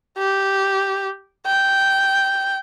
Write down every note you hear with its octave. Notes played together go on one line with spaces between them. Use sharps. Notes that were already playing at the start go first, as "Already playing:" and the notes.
G4
G5